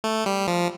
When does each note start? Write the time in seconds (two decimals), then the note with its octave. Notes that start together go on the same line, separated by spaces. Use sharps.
0.04 A3
0.26 G3
0.47 F3